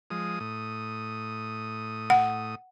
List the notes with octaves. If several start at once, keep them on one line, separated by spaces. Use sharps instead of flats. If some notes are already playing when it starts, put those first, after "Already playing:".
F3 G#3 D#6
A2 D#6
F#5